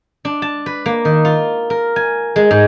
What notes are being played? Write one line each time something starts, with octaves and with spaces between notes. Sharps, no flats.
D4
A5
B4
A#3
D#3
F4
A#4
G#5
G#3
G#2